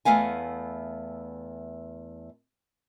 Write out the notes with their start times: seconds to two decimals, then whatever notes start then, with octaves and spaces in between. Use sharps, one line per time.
0.05 E2 A3 B3 F5 G#5